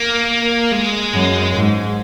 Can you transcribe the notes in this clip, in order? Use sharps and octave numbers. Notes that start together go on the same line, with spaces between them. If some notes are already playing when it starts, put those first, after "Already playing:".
Already playing: A#3
G#3
F#2
G#2